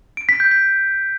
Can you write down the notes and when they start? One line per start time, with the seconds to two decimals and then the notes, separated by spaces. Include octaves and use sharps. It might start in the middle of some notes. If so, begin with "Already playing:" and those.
0.17 D7
0.29 B6
0.40 G6
0.51 B6